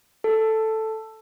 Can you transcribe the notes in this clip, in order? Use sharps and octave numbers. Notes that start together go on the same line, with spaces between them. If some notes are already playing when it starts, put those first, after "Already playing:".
A4